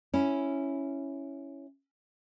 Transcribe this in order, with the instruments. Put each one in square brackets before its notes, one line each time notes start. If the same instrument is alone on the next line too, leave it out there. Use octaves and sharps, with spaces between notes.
[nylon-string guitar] C#4 E4